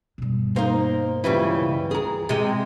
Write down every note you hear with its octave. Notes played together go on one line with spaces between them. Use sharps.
G2 B2
A#3 D#4 C5
C#2 C#3 E3 G3 E4
F4 G#4 A#5
C3 G#3